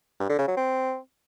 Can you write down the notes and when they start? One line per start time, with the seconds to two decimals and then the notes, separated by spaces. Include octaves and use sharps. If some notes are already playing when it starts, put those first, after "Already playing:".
0.20 G2
0.29 D3
0.38 C#3
0.48 F#3
0.57 C4